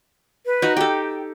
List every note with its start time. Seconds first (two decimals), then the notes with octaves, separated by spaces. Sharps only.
0.46 B4
0.62 D#4 F#4
0.77 G4 A4 G5